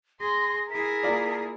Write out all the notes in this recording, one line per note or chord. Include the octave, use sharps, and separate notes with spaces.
G#4 C6 A#6
E4 G#4 A#4 B6
A#3 F4 D5